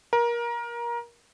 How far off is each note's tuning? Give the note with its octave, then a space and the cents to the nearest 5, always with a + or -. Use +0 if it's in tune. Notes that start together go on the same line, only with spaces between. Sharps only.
A#4 +25